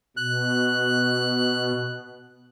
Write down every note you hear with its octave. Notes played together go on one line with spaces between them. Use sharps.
B2 F#6